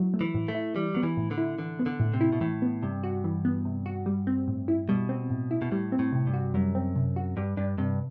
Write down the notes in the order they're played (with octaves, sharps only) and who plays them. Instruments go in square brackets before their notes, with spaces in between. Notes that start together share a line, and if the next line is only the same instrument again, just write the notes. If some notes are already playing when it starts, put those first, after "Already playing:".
Already playing: [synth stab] F#3 E4
A3
[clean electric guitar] E3
[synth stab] A2
[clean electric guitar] A3
[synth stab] E4
[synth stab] E3 [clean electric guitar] G3
[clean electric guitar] F#3 [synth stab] B3
[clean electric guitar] E3
[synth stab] A2
[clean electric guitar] D3
[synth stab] E4
[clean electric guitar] D3 [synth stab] E3
[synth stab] B3
[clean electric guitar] D3
[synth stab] A2
[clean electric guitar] C3
[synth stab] E4
[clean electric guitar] B2
[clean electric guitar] A2 [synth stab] E3
[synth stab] B3
[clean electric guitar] G2 [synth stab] C3
[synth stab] F#4
E3
B3
C3
F#4
G3
C4
A2
E4
[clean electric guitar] B2 [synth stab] G3
[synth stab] C4
A2
E4
[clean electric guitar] B2
[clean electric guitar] A2 [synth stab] G3
[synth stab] C4
[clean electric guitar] A2
[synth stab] C3
[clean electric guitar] G2
[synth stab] F#4
[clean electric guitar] F#2 [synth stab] G3
[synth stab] C4
C3
F#4
[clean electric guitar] G2 [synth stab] G3
[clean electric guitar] G2 [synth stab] D4
[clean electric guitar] G2 [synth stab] C3